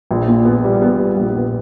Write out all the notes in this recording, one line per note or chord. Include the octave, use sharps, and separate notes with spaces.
A#1
A#2
B3
G3
B3
G3
A#1
B3